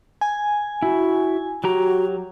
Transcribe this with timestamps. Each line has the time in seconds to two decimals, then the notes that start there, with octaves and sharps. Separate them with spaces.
0.21 G#5
0.83 E4 F#4
1.64 F#3 F#4 G4 A#5